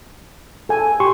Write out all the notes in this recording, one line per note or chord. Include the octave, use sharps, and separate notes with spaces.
A4 G#5
G4 C6 C#6